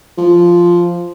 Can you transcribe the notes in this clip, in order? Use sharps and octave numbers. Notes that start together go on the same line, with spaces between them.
F3